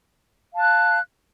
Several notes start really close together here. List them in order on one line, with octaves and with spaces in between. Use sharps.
F5 A5 F#6